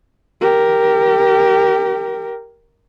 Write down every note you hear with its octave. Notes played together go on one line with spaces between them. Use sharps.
G4 A#4